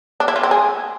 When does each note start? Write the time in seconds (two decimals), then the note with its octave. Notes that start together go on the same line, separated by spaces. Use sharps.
0.20 D4
0.28 E4
0.36 F4
0.43 C4
0.51 G#4